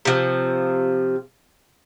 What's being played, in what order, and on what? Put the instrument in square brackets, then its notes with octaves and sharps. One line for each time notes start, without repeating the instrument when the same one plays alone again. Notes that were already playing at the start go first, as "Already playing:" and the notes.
[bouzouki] C3 F3